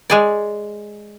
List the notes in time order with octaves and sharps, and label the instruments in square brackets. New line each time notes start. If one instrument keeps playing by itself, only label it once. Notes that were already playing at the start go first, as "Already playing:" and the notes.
[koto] G#3 G#4 D5